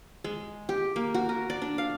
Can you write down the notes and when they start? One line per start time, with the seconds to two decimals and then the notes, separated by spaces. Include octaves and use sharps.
0.24 G#3
0.69 G4
0.96 A#3
1.14 F#4
1.29 A#4
1.50 D5
1.62 D4
1.78 F5